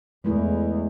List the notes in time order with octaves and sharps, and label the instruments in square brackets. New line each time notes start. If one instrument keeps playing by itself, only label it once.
[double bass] E2 [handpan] G#3 A3 E4